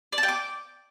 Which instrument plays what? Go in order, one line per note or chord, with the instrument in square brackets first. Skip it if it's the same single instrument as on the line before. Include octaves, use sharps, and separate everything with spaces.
[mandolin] D5
A5
G5
D6